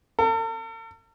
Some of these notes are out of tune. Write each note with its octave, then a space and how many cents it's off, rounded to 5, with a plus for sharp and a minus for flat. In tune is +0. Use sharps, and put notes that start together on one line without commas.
A4 +45